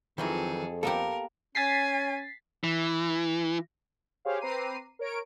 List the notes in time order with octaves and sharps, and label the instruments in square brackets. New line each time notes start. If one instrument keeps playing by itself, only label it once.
[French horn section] F2 [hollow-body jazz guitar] D#3 E3 F#3 [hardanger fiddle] G#4 A4
[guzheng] A#3 B3 G4 [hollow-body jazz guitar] A4 [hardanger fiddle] A#4
[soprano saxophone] C#4 [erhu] G#5 [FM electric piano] A6 B6 C7
[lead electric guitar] E3
[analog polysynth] G4 G#4 C5 C#5 F5
C4 B4 A#5 D6 C7 D#7
A#4 C#5 D7